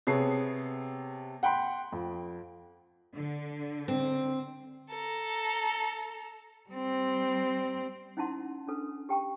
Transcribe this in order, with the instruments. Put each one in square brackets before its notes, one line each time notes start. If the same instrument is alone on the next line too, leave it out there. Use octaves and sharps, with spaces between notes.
[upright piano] C3 B3 G#4 C#5 A5 C7
F#5 G5 B5 C6
F2
[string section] D3
[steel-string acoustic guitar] C4
[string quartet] A4 A#5
[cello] G3 C4
[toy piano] C#4 D#4 E4 F#5 A5 C6
C#4 D4 A4 B4
G4 G5 A5 C#6